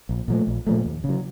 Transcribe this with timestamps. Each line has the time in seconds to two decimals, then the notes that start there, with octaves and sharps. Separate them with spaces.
0.09 A#1
0.28 A#2 F3 A3
0.47 A#1
0.67 A#2 F3 A3
0.86 D#2
1.04 C#3
1.09 F#3